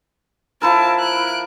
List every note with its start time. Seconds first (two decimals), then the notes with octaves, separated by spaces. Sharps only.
0.62 F3 E4 A#4 A5
0.99 F#6 D7